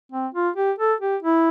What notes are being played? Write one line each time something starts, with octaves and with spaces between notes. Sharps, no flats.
C4
F4
G4
A4
G4
E4